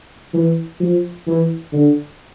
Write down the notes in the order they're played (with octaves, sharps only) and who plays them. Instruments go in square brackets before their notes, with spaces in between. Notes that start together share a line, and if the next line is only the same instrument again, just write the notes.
[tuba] E3
F3
E3
D3